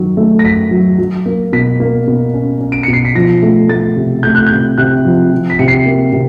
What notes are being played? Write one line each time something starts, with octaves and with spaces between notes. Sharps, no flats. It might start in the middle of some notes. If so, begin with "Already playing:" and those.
Already playing: F#2 D#3 F#3
A3
A#6
F#2 B6
F#3
F#3
A#3
B2 B6
A#3
B2
C#4
C#4
D7
B2 C#7
C7
B6
F3 A#6
A3
A3 A6
C3
A3 G6
F#6
C3 G6
C3 F#6
F3
F3
B6
C3 C#7
C7
A#3
C3